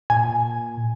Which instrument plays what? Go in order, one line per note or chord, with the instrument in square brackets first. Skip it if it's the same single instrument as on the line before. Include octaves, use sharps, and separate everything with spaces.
[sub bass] A#2 [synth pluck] G#5